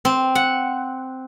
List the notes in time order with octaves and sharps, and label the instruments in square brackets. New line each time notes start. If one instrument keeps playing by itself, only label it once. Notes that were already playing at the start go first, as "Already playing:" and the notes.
[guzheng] C4
F#5